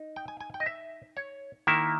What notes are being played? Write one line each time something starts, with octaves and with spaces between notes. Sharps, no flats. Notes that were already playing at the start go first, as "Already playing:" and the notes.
Already playing: D#4
G5
G#5
G#5
G5
D#5
E5
C#5
D#3 A#3 E4 E5